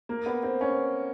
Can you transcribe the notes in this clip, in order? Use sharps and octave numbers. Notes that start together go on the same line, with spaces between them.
A#3
B3
C4
C#4